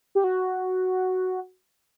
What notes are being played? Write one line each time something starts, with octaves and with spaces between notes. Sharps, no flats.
G4
F#4